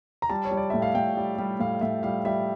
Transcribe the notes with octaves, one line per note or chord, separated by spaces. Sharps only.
A#5
G3 A5
C#5
G3
D5
A2 E5
F5
A2 G5
G3
G3
A2 F5
A2 E5
G3 F5
G3 E5